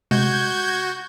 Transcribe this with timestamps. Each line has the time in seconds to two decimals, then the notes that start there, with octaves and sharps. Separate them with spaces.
0.11 C3 G#3 F#4 G6 G#6